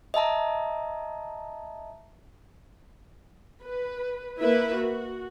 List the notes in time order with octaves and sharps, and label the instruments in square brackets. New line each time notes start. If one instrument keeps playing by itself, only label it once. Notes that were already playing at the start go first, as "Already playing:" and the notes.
[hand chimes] D#5 E5 A5 A#5
[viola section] B4
A#3 E4 B4 E5
F#4